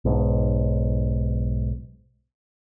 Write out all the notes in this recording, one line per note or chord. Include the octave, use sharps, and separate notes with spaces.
B1 G#2